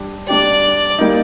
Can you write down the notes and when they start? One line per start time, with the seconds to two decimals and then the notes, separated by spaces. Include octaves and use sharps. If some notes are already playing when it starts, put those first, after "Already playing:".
Already playing: G3 D4
0.28 G3 D4 G4 D5
0.99 G3 A#3 D#4